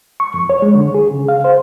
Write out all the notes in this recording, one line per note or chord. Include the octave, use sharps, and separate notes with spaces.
C#6
F2
C#5
G#3
D3
G#4
C#3
F5
C5